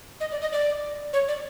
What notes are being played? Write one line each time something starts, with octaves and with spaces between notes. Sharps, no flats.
D#5
D5
D#5
D5
C#5
D5